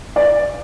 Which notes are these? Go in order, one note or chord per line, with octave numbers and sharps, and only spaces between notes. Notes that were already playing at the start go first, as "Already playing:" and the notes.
D5